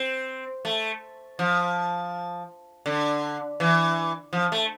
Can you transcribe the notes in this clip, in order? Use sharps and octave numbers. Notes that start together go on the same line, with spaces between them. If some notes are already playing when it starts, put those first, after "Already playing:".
Already playing: C4
A3
F3
D3
E3
F3
A3